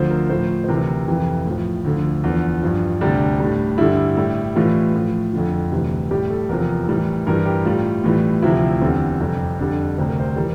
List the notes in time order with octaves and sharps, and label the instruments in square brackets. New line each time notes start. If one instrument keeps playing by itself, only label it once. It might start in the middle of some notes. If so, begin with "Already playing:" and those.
Already playing: [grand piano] D2 D3 F3 C5
A#4
A2 F3 C5
C5
D2 C3 E3 G3 A#4
F2 C3 E3
A2 F3
D2 D3 F3
E2 D3 F3
G2 F3
D2 C3 G3 D4
A2 G3
G2 D3 G3 E4
A2 G3
A2 E3 G3 F4
A2 F3
F2 D3 F3
D2 C3 E3 G3
A2 G3 G4
A4
E2 C3 F3 A#4
A2 E3 G3
G2 E3 G3 A#4
G4
A2 G3 F4
A2 E3 G3
D2 C3 F3 E4
E2 D3 G3 C4
F2 C3 G3
F2 D3 G3 D4
D2 C3 G3 C5
A#4
C5
E3 G3 A#4